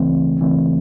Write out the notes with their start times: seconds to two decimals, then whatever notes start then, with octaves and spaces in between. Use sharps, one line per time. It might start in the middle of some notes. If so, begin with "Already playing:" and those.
Already playing: C#2 C#3 E3 A3 C4
0.40 C#2 C#3 E3 A3 C4